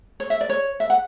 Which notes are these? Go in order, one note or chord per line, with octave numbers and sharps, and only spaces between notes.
C#5
E5
D5
C#5
E5
F#5